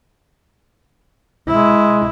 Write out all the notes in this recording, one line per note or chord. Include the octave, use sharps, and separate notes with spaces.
G#3 E4